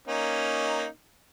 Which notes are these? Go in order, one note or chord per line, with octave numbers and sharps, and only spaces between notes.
A#3 C#4 D#4